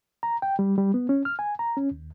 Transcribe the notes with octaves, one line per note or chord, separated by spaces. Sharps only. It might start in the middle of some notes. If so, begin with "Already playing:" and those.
A#5
G5
G3
G3
B3
C#4
F6
G#5
A#5
C#4
D#2